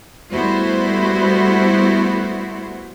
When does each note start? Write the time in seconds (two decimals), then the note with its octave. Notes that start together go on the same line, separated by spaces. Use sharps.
0.33 G3 A3 B3 E4 F#4 C5